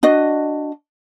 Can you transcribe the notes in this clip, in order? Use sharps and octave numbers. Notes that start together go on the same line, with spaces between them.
D4 F#4 D#5